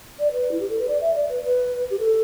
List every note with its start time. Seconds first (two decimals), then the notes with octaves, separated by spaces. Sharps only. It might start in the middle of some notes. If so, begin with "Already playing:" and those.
0.19 D5
0.31 B4
0.51 E4
0.60 G4
0.69 A4
0.79 B4
0.87 D5
1.01 E5
1.15 D5
1.29 B4
1.43 B4
1.90 G4
1.99 A4